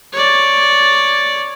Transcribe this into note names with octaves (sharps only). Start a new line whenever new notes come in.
C#5 D5